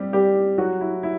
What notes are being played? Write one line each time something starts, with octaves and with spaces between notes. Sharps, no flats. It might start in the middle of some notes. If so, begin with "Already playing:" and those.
Already playing: G3 C4 G4
G3 G4
F#3 F#4
E4
E4